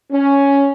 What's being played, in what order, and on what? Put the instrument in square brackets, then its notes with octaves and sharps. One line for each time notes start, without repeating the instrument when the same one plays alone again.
[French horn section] C#4